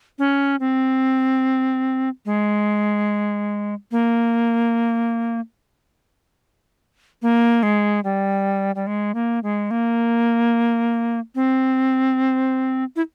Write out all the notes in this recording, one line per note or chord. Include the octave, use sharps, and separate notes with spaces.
C#4
C4
G#3
A#3
A#3
G#3
G3
G3
G#3
A#3
G#3
A#3
C4
E4